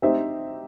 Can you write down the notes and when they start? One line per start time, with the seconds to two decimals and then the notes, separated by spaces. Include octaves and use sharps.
0.02 C4 D#4 G4 C5 E5